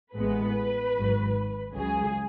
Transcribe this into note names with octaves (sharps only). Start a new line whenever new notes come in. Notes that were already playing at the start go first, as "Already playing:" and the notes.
A1 A2 G#3 B3 B4
G#1 G#2 F#3
C#2 C#3 F#3 G#4